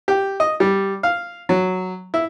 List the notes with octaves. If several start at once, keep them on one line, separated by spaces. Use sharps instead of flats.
G4
D#5
G3
F5
F#3
E4